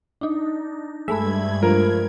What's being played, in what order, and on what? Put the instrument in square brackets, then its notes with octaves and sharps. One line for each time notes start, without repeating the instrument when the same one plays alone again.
[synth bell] D4 D#4
[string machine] G2 G#6 [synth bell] G#3 A3 B5 [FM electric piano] E5
[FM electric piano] F3 [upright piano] A#4